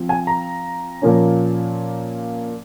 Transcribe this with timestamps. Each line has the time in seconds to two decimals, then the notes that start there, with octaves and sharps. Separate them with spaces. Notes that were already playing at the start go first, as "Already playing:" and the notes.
Already playing: F3 C4
0.09 G#5
0.27 A#5
1.02 A#2 F3 A#3 C#4